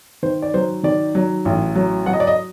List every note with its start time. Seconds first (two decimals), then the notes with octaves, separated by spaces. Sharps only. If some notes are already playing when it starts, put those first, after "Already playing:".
0.23 D#3 C5
0.42 D5
0.54 F#3 C5
0.83 D#3 D5
1.15 F#3
1.45 A1
1.75 F#3
2.06 F#3 F#5
2.13 D#5
2.20 D5
2.27 D#5